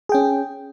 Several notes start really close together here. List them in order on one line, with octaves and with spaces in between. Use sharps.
G#4 G5 C#4